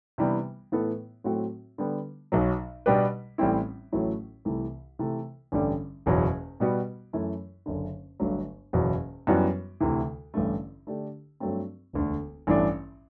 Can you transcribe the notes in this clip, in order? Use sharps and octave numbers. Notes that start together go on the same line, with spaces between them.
C3 E3 G3 B3 D4
A2 E3 B3 E4 A4
A2 F#3 A3 C4 F#4
D3 G3 B3
B1 B2 F#3
B2 G3 D4 G4 B4
A1 A2 G3 C4 E4
A1 A2 F#3 A3 E4
C2 C3 E3 A3
C3 E3 A3
A1 G2 D3 G3
F#1 E2 B2 F#3
B2 G3 B3 F#4
F#2 E3 A3 E4
F#1 F#2 D3
G1 G2 F#3 A3
F#1 E2 B2 F#3
F#2 E3 G3 B3 F#4
D2 C3 E3
A1 G2 D3 A3
D3 A3 D4 G4
G2 F#3 A3 C4
E1 D2 D3
A1 G2 E3 A3 D4